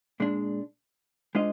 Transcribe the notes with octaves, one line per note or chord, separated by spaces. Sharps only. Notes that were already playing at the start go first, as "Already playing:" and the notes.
A#2 G#3 D4
G#3 D4 F4 C5 D#5